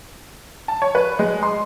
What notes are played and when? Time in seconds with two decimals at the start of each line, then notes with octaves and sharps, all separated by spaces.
0.68 A5
0.82 C#5
0.95 B4
1.19 G#3
1.43 C6